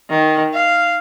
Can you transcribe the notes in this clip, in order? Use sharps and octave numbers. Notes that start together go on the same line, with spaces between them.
D#3
F5